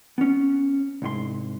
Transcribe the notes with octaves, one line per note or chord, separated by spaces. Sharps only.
B3 C#4
C2 G#2 C6